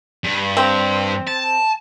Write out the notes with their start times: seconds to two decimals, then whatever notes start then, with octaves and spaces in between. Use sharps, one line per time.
0.24 G2
0.57 C4
1.27 A5